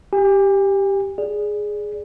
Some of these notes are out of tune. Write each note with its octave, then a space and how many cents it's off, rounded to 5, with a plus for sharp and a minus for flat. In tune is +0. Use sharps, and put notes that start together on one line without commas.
G4 +0 G#5 -40
G#4 +0 D5 +0